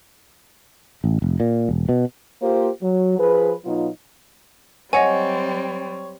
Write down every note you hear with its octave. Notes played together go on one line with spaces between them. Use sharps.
A1
F1
A#2
E1
B2
A#3 F4 G4 C5
F#3
F3 G#4 B4
B2 F#3 D#4 F4
F#3 G3 C4 C#5 D#5 F#5 G#5